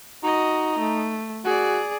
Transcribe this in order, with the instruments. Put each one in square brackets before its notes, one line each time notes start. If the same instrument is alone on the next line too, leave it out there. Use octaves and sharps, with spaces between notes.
[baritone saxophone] D#4 [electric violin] F#4 D#5
[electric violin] A3
[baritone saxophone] F#4 [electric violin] G#4 D5